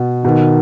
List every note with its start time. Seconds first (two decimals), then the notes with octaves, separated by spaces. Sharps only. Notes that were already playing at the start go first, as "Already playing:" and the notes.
Already playing: B2
0.24 B2 D#3